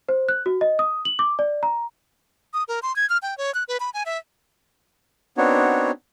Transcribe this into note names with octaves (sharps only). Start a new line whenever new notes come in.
C5
F#6
F#4
D#5
D#6
F#7
D6
D5
A#5
D#6
A#4
C6
G#6
F6
G5
C#5
F#6
B4
B5
G#5
E5
B3 C4 D4 D#4 F#4 C#5